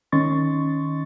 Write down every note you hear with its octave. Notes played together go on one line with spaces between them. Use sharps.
D#3 C#4 D#5 C6 C#6 A6